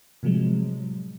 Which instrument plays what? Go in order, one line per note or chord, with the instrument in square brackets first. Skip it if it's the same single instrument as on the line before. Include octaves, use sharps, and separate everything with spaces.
[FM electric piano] A2 C3 F3 F#3 G#3